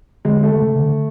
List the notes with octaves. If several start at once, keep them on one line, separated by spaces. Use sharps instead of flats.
D3 G#3
A3
C#3
D3